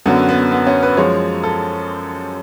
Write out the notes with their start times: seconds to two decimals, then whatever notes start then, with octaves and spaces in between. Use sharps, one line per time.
0.06 F#2 D3 F#3 B3
0.29 B3
0.52 B3
0.67 C#4
0.83 B4
0.97 F#2 F3 G#3 C#5
1.43 A4